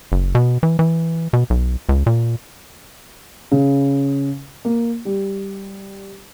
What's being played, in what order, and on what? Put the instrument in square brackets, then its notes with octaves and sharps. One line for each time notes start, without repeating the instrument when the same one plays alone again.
[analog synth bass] F#1
B2
E3
E3
B2
B1
C#2
A#2
[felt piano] C#3
A#3
G3